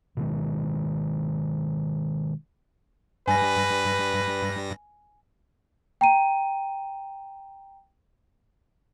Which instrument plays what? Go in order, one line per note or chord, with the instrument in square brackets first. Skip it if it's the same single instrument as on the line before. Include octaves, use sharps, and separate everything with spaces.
[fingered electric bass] B2 D#3 G#3
[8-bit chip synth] G2 G3 A#6 [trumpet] B4 [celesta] G#5
[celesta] G5 A#5 D#7